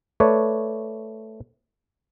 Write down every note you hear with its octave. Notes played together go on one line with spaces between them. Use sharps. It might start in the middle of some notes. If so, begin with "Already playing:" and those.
A3 B4 C#5 D5